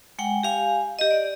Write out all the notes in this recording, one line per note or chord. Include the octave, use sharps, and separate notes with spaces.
G#3 F#5 G5
G4 F5 G#5
G4 D#5
D5